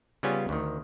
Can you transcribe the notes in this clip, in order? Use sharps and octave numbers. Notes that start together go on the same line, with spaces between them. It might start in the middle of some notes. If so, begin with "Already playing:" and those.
C#3 G3 B3 C#4 F4 G#5
D2 D#3